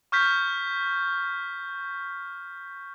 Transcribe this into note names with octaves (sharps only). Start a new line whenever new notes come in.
C#6 F6 G6 B6